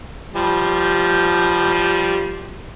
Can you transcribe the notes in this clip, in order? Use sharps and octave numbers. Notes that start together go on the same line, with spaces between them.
F3 G3